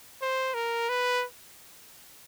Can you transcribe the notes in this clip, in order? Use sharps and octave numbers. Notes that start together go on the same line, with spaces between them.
C5
A#4
B4